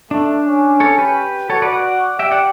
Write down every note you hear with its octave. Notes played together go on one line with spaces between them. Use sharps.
A3 D4
C#4
A4 C#5
G4 B4
F#4 A4 C#5
B4 D5
D5 F#5
G4 E5 G5
D5 F#5